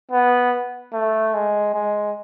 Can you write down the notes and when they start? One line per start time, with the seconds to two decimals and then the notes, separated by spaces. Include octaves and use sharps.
0.11 B3
0.93 A3
1.34 G#3
1.74 G#3